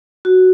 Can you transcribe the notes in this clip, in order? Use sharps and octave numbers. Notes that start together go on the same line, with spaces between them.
F#4